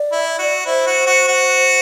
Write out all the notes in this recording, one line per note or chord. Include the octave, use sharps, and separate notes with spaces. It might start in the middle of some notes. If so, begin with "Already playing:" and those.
Already playing: D5
E4
F#4
E4 C5
F#4
F#4
F#4